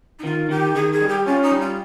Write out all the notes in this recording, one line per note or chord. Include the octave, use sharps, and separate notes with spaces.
D#4
D#3 F4
D#3 G4
D#3 G#4
G#4
G3
G4
C#4 F4
D#4
G3
F4